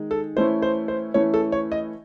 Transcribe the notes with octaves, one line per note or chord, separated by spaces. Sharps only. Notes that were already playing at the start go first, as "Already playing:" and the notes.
Already playing: D#3 G#3 D#4
A4
E3 A3 C#4 E4 C5
C5
C5
E3 A3 C#4 E4 C#5
A4
C#5
D#5